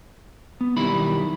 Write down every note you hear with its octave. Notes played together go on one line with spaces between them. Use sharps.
B3
B1 D#3 G3 E4 B5